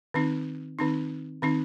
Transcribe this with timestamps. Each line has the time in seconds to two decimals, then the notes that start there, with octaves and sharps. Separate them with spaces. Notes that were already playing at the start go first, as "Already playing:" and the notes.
0.14 D#3 C4 D#4
0.79 D#3 C4 D#4
1.42 D#3 C4 D#4